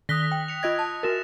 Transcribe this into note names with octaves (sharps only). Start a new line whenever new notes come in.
D#3 D#6 F#6 A#6 B6 G7
G5
B6 C#7 F7
F4 D#5 G#6 A#6
A5
F#4 A#4 A6 A#6 E7